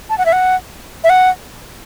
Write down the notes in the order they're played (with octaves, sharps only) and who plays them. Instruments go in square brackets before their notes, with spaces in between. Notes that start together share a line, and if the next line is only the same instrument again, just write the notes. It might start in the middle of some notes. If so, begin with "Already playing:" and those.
[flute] A5
F#5
E5
F#5
E5
F#5